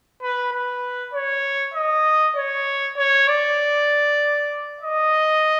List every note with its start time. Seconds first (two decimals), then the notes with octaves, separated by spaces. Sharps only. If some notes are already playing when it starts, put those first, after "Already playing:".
0.22 B4
0.53 B4
1.14 C#5
1.74 D#5
2.36 C#5
2.97 C#5
3.28 D5
4.81 D#5